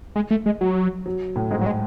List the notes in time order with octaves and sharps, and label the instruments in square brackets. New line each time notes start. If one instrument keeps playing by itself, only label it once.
[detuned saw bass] G#3
A3
G#3
F#3
[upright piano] F#3
A2
[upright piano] G#2 [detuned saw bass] G#3
[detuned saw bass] F#3
G#3